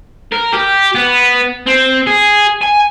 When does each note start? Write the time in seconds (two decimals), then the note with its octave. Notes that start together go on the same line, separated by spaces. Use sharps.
0.32 A#4
0.53 G4
0.95 B3
1.66 C4
2.07 G#4
2.61 G#5